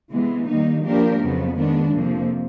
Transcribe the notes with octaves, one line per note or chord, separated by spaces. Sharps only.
C3 E3 G#3 B3
D#3 G3 A#3 D#4
F3 A#3 D4 G4 A#4
F2 C#3 F#3 B3
D#3 G#3 B3 D4
F2 C3 F3 A#3